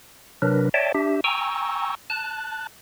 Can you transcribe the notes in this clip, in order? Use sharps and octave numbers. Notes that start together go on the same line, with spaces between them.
C3 F#3 D4 A#4 B4
C#5 D5 E5 G5 A5
D4 G4 E5
G5 G#5 A#5 C#6 E6
A5 F#6